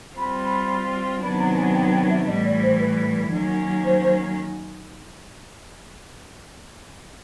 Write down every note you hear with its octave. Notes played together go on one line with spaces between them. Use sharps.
G3 C4 F4 B5
B5
C3 D#3 F#3 B3 D4 B5
A#5
G#5
G5
G5
E5
A2 E3 G3 D#5
D5
C5
B4
D#3 F#3 A#3 C#4
C5
C5